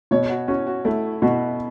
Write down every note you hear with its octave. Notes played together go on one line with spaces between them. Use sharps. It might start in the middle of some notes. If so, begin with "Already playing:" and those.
B2 C#5
F#4
C#4 F#4
F#4
A3 E4
B2 F#4